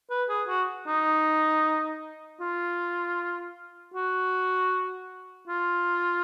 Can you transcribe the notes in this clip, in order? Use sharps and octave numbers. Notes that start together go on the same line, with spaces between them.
B4
G#4
F#4
D#4
F4
F#4
F4